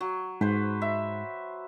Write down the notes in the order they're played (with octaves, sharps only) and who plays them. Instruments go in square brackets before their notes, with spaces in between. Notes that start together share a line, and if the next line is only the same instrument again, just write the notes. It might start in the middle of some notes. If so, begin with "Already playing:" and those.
[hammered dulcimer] F#3
[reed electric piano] G#2 [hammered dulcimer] B4 C5
[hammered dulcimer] E5